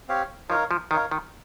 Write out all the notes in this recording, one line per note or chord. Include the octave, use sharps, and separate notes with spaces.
C4 G4 C#5 F5
F3 D#4 A#4 C#5 F5
F3
D#3 D#4 A#4 C#5 F5
D#3